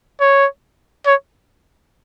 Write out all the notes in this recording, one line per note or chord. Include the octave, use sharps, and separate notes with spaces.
C#5
C#5